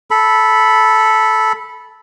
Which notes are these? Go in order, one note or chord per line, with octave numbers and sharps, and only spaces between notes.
A4 B5